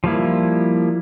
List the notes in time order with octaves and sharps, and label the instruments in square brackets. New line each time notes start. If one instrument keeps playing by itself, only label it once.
[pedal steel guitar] F3 G3 A#3 E4